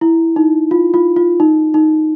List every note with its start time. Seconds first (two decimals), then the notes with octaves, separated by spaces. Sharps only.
0.01 E4
0.36 D#4
0.71 F4
0.94 F4
1.16 F4
1.40 D#4
1.74 D#4